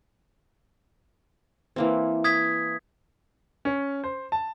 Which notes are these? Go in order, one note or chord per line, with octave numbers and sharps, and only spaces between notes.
E3 A#3 C4
D#6 G#6 B6
C#4
C5
A5